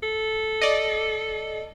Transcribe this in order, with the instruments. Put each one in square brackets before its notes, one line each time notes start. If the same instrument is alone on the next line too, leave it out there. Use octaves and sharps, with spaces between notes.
[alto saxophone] A4
[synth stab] D5 D#5